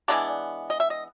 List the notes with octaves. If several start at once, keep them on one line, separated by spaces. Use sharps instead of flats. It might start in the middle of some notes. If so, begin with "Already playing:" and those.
E3 G#3 B3 D4 D5
D#5
E5
D#5